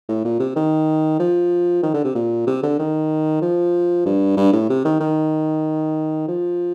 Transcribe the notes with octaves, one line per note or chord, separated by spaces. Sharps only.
A2
A#2
C3
D#3
F3
D#3
D3
C3
A#2
C3
D3
D#3
F3
G2
G2
A2
C3
D#3
D#3
F3